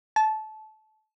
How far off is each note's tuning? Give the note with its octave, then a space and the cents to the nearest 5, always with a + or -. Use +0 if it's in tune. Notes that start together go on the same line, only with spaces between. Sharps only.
A5 -20